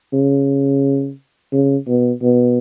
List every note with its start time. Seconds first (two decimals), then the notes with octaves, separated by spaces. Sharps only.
0.13 C#3
1.52 C#3
1.87 B2
2.22 B2